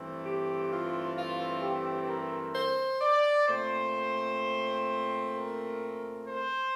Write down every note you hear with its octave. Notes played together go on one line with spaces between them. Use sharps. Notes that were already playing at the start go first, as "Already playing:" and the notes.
Already playing: G2 E3 A3 C4
G4
F4
F4
G4
A#4
C5
D5
A#2 A3 C4 C5
A#4
C5